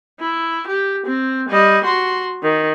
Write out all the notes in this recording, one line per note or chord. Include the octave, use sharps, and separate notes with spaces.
E4
G4
C4
G3 D#5
F#4 C6
D#3